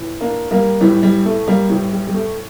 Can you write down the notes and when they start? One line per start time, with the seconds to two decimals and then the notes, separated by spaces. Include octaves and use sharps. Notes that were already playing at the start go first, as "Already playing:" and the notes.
Already playing: A2 E3
0.21 A#3 D4
0.51 G3 A#3
0.81 A2 E3 G3
1.03 G3
1.25 A3
1.47 G3 A#3
1.69 A2 E3 G3
1.93 G3
2.07 G3
2.14 A3